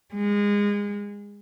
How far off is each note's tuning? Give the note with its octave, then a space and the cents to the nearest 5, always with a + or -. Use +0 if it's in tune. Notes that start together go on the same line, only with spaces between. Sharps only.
G#3 -25